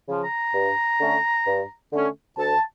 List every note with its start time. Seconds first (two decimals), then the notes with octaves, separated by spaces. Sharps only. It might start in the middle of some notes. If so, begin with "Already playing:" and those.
0.09 C#3 F3
0.24 A#5
0.54 G2
1.00 D3 A3 C#4
1.46 G2
1.93 D3 A3 C#4
2.38 D2 A5